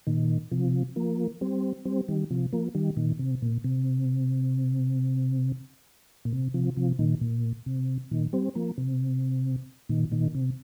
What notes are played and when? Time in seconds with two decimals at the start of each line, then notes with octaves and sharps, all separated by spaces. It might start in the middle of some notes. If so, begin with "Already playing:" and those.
0.07 A#2 D#3
0.51 C3 F3
0.96 F3 A#3
1.41 G3 C4
1.85 G3 C4
2.08 D#3 G3
2.30 C3 F3
2.53 F3 A#3
2.75 D#3 G3
2.97 A#2 D#3
3.19 C3
3.42 A#2
3.64 C3
6.25 A#2
6.32 C3
6.54 C3 F3
6.77 C3 F3
6.99 A#2 D#3
7.21 A#2
7.66 C3
8.11 A#2 D#3
8.33 G3 C4
8.55 F3 A#3
8.78 C3
9.89 A#2 D#3
10.12 A#2 D#3
10.35 C3